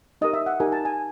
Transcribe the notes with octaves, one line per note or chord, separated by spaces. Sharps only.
D#4 G4 A#4 D#5
E5
F#5
D#4 G4 A#4 G#5
A5
G#5